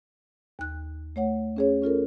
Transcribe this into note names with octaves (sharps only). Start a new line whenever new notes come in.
D#2 F#6
A3 C#5 F#5
C#4 G#4 C#5
C#4 F4 A4 A#4